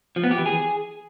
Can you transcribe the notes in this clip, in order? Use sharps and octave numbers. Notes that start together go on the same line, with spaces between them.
F3
B3
G4
E3
G#4